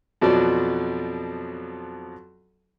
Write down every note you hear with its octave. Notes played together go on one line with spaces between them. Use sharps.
F2 B2 F3 F#3 D5